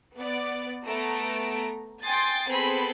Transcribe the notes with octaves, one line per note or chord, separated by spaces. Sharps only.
B3 D5
A3 B3 A#5 D7
G5 G#5 C6 D#6 A6
B3 C4 G#4 A4 B5 C6